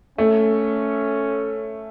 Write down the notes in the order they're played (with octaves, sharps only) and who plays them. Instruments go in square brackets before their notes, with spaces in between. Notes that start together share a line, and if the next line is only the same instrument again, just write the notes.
[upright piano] A3 [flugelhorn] C#4